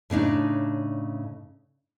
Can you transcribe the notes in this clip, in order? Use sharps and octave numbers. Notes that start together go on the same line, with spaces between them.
A2 C#3 D4 D#4